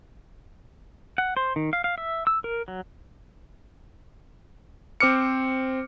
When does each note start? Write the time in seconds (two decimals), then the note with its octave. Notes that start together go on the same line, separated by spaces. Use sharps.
1.18 F#5
1.37 C5
1.56 D#3
1.73 F5
1.84 F5
1.98 E5
2.27 E6
2.44 A#4
2.68 F#3
5.00 C4 C5 D6 F6 C#7